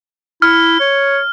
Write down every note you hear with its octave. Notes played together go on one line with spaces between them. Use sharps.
E4 F6
C#5